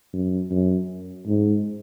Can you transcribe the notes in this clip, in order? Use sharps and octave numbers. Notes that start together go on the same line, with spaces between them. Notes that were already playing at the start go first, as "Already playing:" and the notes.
F#2
F#2
G#2